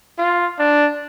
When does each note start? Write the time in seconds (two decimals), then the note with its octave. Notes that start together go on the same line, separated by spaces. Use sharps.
0.19 F4
0.59 D4